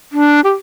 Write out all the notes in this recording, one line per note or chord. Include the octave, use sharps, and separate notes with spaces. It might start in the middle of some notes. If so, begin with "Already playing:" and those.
D4
G4